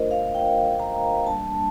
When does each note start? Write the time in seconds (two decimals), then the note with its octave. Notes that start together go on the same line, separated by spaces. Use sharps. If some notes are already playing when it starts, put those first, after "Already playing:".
Already playing: A3 D4 F4 A#4 C5 D#5
0.11 F5
0.35 G5
0.80 A#5
1.26 G3 A#3 D4 A5